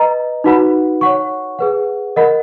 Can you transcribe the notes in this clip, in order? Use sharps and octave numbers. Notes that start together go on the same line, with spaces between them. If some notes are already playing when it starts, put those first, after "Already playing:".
Already playing: B4 D#5 A#5
D#4 F#4 B4 F#5 B5
C#5 F#5 C#6
G#4 B4 F#5
A#4 D#5 F#5 B5